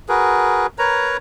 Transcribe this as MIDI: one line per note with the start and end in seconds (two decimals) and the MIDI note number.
0.09 0.67 66
0.09 0.67 68
0.09 0.67 70
0.09 0.67 71
0.79 1.17 70
0.79 1.17 71
0.79 1.17 73
0.79 1.17 82